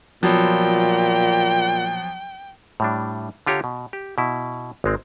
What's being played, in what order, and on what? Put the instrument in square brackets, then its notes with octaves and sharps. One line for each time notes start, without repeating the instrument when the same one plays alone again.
[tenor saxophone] A#2 [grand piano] F3 F#3 B3 [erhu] G5
[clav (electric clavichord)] A2 G3 D4
D3 F4 G4 C#5 A#5
B2
G4
B2 E4
G#1 G#3 C4